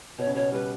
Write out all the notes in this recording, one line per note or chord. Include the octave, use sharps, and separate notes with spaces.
B2 B3 C#5
C#3 C#4
B2 B3 C#5
G3 B4